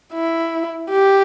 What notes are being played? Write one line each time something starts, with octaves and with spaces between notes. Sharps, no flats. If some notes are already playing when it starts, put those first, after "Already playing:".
E4
G4